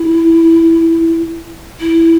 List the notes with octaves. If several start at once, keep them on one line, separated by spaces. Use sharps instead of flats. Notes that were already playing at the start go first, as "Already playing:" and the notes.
Already playing: E4
E4